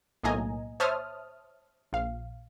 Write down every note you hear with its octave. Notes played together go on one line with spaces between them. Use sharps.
B1 A2 A#3 D#5 G#5 A#5
C5 C#5 E5 A5 D#6 F6
A#1 F5